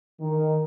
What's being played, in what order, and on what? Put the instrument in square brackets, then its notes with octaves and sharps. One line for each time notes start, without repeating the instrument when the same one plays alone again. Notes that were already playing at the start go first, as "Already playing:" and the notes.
[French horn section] D#3